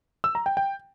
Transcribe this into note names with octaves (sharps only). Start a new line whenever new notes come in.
E6
A#5
G5
G5